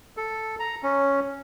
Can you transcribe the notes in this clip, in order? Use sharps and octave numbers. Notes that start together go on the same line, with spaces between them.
A4
A#5
C#4